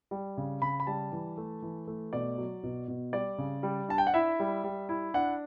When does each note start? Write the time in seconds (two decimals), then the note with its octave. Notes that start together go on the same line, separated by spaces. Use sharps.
0.11 G3
0.37 C#3
0.62 C#3 B5
0.80 B5
0.87 G3 A5
1.12 E3
1.37 A3
1.62 E3
1.88 A3
2.13 B2 D5
2.38 F#3
2.64 B2
2.88 B2
3.13 G3 D5
3.38 C#3
3.63 G3
3.89 D4 A5
3.98 G5
4.07 F#5
4.14 E4 E5
4.40 G3
4.64 G3
4.89 E4
5.14 D4 F#5